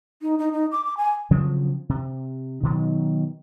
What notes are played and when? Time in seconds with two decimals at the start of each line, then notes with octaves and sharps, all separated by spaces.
0.22 D#4
0.39 D#4
0.52 D#4
0.72 D6
0.85 D6
0.97 G#5
1.31 C#3 F3 F#3 C4
1.89 C3
2.63 B2 D#3 F#3